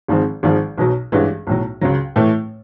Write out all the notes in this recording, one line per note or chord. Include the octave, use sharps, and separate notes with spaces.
G#1 G#2 F3 G#3 C4
G#1 G#2 F3 G#3
B1 B2 F#3
A1 G2 E3 G#3
B1 A2 F#3
C#2 C#3 F#3
A2 E3 A3